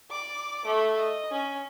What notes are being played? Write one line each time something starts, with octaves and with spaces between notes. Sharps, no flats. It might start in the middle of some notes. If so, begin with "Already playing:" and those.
D5 D6
A3
D#5
C#4